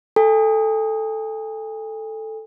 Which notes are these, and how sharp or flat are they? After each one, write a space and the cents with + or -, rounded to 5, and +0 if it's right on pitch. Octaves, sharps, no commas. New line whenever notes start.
A4 +0 G#5 -40